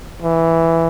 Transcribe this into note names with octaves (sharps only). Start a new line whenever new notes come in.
E3